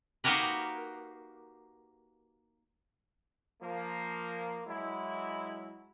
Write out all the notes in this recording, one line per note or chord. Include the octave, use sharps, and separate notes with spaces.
A#3 D#4 F#4 G4 A#4 B4
F3 A#3
F#3 G#3 E4